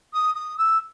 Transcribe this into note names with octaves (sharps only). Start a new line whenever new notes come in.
D#6
D#6
E6